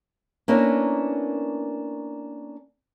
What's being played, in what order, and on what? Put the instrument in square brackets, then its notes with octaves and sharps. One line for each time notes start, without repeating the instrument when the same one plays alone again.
[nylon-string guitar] A#3 B3 C#4 D4 E4 A#4